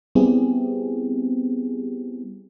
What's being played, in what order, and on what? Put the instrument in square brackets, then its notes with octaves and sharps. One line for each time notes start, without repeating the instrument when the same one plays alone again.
[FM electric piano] G3 B3 C4 E4 G4 G#4